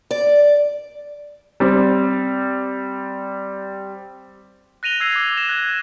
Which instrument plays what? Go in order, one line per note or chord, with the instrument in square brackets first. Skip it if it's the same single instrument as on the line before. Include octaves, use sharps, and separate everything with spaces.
[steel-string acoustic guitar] D5
[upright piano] G3 C4
[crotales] F#6 A#6 D#7 F7 G7
E6 G#6 C7 D#7 F7 G7
D6
A#6 E7
F#6 G#6